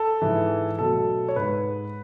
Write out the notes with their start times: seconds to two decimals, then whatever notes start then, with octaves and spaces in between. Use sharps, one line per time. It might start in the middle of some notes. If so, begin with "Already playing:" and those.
Already playing: A4
0.22 G#2 E3 G#3
0.79 B2 F#3 A3 A4
1.29 C#5
1.36 G#2 G#3 B4